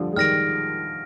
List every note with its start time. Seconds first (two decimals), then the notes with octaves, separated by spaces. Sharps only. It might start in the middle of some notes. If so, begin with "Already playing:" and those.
Already playing: D3 F3 G3
0.13 G#3
0.16 D#3 G3 F6 A#6 D7